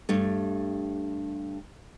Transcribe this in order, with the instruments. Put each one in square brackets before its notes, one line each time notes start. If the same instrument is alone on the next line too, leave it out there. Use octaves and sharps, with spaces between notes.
[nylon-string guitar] G2 A3